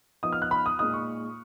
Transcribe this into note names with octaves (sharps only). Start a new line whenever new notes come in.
F3 B3 D#4 D#6
F6
F#6
B5
D#6
A#2 G#3 D#4 D#6
C#6